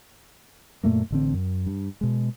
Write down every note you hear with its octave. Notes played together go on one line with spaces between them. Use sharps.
F#2 A#2 A3 A#3
A1 D3 C4
F#2
G2
B2 G#3